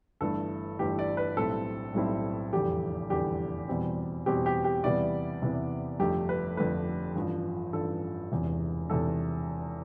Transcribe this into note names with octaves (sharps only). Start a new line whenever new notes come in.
G1 G2 E3 A3 A4
G1 G2 E3 A3 G4
D5
B4
B1 A2 G3 C4 E4 A4
B1 A2 G3 C4 E4
F1 E2 D3 G3 G4
F1 E2 D3 G3 G4
E2 B2 G3 C4
E2 B2 G3 C4 G4
G4
G4
E2 C3 G3 B3 E4 D5
E2 C3 G3 B3 E4
G1 F2 D3 A3 G4
B4
G1 F2 D3 A3 B4
A1 G2 F3
A1 G2 F3 A4
E1 E2 C3
E1 E2 C3 A4